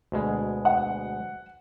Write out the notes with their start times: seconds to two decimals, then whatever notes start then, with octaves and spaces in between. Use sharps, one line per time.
0.12 D2 B2 G#3
0.65 F#5